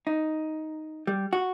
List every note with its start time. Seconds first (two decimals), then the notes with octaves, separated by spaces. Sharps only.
0.07 D#4
1.07 G3
1.33 F#4